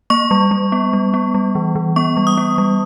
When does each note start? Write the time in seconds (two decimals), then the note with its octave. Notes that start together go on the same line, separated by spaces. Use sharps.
0.10 A#3 C#6
0.31 G3
0.51 G3
0.72 B3
0.93 G3
1.14 B3
1.34 G3
1.55 E3
1.75 E3
1.96 B3 C#6
2.17 G3
2.27 D#6
2.37 B3
2.58 G3